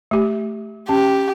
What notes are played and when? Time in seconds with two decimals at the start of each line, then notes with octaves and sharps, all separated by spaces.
0.11 A3 G4
0.89 C#4 G4